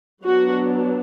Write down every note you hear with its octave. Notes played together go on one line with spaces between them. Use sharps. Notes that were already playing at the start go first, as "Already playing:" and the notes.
F#3 B3 D4 F#4